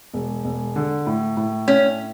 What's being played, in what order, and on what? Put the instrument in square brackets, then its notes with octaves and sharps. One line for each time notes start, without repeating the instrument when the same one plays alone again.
[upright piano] E1
E1
D3
A2
A2
[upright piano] A2 [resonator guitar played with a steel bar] C#4